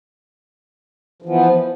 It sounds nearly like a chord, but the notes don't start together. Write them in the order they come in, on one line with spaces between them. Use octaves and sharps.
F3 E3 B3